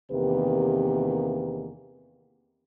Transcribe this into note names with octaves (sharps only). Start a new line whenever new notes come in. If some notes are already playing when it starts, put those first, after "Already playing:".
E2 C3 D#3 A#3 G4 B4